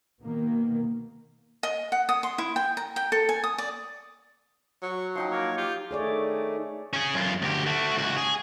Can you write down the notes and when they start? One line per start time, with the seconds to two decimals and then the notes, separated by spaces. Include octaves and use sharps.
0.20 B2 D#3 A#3
1.63 D#5
1.92 F#5
2.09 D#6
2.23 C6
2.38 E4
2.56 G5
2.77 A#5
2.96 G5
3.12 A4
3.29 G#5
3.44 D#6
3.58 D5
4.83 F#3 C#6
5.15 F3 D#4 G5 C6
5.31 A#3 C#5
5.57 F4 G4
5.91 D#3 A3 G#4 C#5 D5
6.93 C#4 G#4
7.14 F#2 F4
7.42 D2 G4
7.66 A3 F#4
7.97 C#2 F#4
8.17 G#4